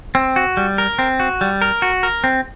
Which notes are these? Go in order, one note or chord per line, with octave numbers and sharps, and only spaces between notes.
C4
F#4
G3
A#4
C4
F#4
G3
A#4
F#4
A#4
C4